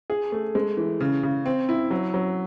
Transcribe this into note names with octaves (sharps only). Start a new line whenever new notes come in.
G#4
A3
G#3
E3
C#3
C#3
C4
E4
F#3
F#3